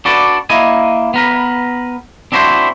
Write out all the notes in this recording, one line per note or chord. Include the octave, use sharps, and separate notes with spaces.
D4 F#4 A4 B4 D5
A#3 E4 D#5 G#5
B3 A#4 B4
C4 D4 E4 F#4 B4 C5